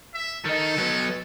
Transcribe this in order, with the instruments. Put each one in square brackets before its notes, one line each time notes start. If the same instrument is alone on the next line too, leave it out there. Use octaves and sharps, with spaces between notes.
[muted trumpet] E5
[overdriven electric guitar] D#3 D#4 [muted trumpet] A4
[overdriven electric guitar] F#3 B3